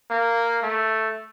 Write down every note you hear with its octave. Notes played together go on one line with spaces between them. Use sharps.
A#3
A3